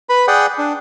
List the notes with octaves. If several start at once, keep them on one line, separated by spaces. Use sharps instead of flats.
B4 B5
G#4 D5 F#5 G5
D4